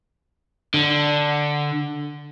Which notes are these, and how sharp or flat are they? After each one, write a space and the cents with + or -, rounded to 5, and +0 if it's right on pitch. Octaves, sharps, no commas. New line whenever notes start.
D3 +5